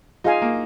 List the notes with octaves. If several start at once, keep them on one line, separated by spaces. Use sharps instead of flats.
D#4 F4 G#4 F5 G#5
A#3